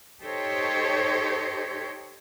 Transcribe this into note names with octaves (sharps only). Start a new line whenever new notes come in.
D#4 G4 A4 C5 C#5